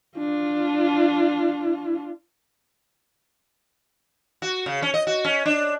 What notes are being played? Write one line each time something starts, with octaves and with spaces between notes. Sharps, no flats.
D4 F4
F#4
C#3
C#4
D#5
F#4
C#4
D4